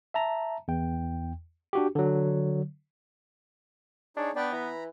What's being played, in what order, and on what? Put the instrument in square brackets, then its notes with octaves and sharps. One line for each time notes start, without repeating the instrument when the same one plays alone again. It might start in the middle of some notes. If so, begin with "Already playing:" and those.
[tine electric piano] E5 A5 A#5
E2 G5
D4 F#4 G4
D3 F#3
[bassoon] D4 [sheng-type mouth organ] D#4 G#4 C#5
[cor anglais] B3 [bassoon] D4 [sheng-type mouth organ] B4 D5 G5
[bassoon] E3 [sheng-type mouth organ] A#5 B5